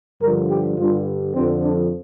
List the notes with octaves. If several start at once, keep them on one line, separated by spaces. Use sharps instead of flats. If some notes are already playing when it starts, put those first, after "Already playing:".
G2 D3 F3 A#4
G4
G2 D3 G3 F4
F2 D3 F3 C4
D4